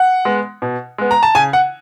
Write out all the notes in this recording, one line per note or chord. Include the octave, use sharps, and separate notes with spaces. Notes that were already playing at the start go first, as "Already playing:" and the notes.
Already playing: F#5
G#3 B3
B2
G#3 B3
A#5
A5
C#3 G#5
F#5